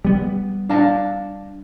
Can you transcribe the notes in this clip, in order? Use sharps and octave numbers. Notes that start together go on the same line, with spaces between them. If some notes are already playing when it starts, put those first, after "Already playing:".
G3 B3
D4 F5 A5